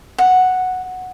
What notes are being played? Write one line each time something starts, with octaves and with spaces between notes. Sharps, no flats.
F#5